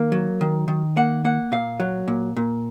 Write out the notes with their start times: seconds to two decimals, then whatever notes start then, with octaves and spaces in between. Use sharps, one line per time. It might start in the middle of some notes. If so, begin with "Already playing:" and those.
Already playing: D#3 A#3
0.12 F#3
0.41 D#3
0.68 D#3
0.97 A#3 F#5
1.25 A#3 F#5
1.52 A#2 F5
1.80 F#3
2.08 A#2
2.36 A#2